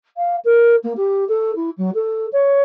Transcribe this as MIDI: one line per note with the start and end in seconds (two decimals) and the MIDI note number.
0.17 0.36 77
0.44 0.75 70
0.83 0.93 58
0.96 1.24 67
1.28 1.54 69
1.55 1.70 64
1.77 1.90 54
1.94 2.26 69
2.32 2.62 73